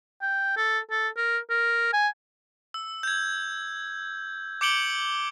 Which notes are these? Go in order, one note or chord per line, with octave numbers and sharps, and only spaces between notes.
G5
A4
A4
A#4
A#4
G#5
E6
G6 G#6
D6 G6 C#7 D7 F#7 G7